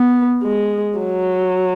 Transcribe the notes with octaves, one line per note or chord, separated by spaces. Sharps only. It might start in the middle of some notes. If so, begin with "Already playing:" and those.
Already playing: B3
G#3
F#3